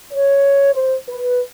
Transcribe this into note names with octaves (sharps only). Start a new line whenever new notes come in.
C#5
C5
B4